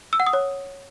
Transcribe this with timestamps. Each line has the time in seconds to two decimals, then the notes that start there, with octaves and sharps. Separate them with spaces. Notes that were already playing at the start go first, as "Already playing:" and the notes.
0.13 E6
0.20 F#5
0.27 D#6
0.33 C#5